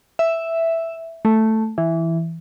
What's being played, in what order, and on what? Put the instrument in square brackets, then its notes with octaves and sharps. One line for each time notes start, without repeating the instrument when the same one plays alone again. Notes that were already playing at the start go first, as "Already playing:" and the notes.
[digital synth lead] E5
A3
E3